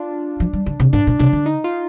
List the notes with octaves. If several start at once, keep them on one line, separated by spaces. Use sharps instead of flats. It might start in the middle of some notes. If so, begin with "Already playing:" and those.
Already playing: D4 F4
F3
G3
D3
C3
G#2 D4
A#2
C3 D4
D3
D#4
F4